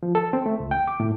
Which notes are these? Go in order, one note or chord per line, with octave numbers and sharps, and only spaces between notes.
F3
A4
C4
A3
C#2
G5
D6
A2